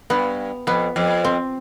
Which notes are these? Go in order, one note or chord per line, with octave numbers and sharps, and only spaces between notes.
G2 B3
F2 B3
F2
C4